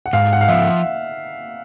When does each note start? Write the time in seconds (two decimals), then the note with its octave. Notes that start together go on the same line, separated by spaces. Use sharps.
0.06 F#5
0.13 G#2 F5
0.33 F#5
0.41 F5
0.48 F3 E5